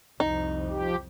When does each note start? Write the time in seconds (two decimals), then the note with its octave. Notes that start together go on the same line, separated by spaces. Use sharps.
0.20 C2 F2 D#4
0.70 F3 G4